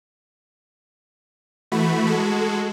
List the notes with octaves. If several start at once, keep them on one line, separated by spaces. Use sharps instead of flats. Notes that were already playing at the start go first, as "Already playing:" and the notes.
E3 A3 F#4 B5
G#3 F#4 A4